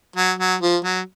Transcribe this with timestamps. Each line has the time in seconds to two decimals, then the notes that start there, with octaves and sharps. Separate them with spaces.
0.16 F#3
0.39 F#3
0.61 F3
0.84 F#3